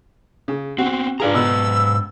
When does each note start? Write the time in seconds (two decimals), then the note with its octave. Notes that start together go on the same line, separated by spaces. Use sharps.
0.48 C#3
0.78 C4 C#4 F#4
1.20 G#2 D4 F4 G#4 B4 A#5
1.34 B2 E6